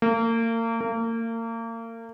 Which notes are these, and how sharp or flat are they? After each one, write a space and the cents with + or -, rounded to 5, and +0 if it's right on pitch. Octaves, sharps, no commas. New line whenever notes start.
A#3 -35
A#3 -35